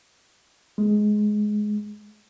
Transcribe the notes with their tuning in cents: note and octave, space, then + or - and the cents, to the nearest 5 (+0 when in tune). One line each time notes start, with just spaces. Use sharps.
G#3 +15